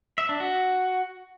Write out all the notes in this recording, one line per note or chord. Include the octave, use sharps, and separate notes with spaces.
E5
D4
F#4